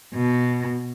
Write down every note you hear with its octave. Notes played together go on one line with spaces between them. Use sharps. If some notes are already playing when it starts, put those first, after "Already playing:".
B2